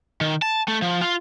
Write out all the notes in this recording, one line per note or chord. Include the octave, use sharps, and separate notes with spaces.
D#3
A5
A3
F3
F4